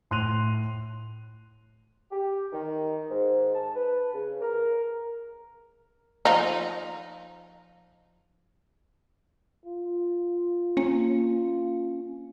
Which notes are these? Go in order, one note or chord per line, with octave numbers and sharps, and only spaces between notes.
A2 C6 F#6 D#7 F7
G4
D#3
G#2
A5
B4
C#3
A#4
F3 D#4
F4
A#3 C#4